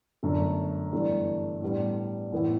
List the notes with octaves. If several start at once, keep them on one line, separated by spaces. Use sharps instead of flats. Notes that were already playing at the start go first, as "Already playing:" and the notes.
G1 F#2 D3 A3 D4
G1 G2 E3 A3 D4
A2 G3 B3 D4
A2 E3 B3 E4